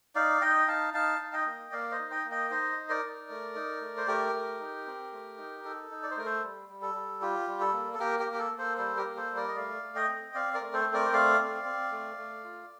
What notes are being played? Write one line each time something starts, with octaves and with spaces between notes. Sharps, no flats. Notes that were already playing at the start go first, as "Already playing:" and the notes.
D#4 D5 F5
D#4 D#5 G5
D#4 F5 A5
D#4 F5 A5
D#4
D#5 G5
A#3
A#3 D5 F5
C5 D#5
D#4
D#5 G5
A#3
D#5 G5
D#4 C5 D#5
D#4
A#4 D5
D#4
A3
D#4
A3
C5
A3 G4 A#4
A3
D#4
C4
A3
D#4
D#4 A4
D#4
D5
C5
A3 A#4
A4 C5
G3
G3
A4
G3
F4 G4
G3
A4
A#3
A4
A#3 G4 A#4
G4 A#4
A#3
G4
A4
A#3
A4 C5
G3 A4 C5
G4 A#4
A#3
A4 C5
G3
A#4 D5
D#5
A3 D5 F5
A3
D#5 G5
C4
C4 D5 F5
A#4 D5
A3
A4 C5
C4
A#4 D5
G5
A3 D5 F5
C4
C4
A3
A3
F4